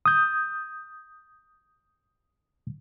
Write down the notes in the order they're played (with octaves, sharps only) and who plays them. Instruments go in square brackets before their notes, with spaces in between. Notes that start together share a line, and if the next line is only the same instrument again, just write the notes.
[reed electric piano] D#6 G6